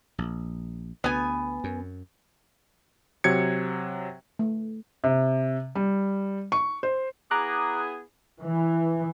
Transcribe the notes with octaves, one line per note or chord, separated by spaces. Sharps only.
A#1
D2 B3 G#5
F#2
C3 F#3 G#6 C#7
A3
C3
G3
C#6
C5
B3 E4 G#4 A#5 D6 F#6
E3